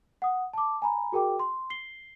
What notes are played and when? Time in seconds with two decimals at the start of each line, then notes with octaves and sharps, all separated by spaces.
0.22 F#5 D#6
0.53 A5 D6
0.82 G#5 A#5 B5
1.12 F#4 G#4 A#4 G5 D6
1.39 C6
1.70 C7 G7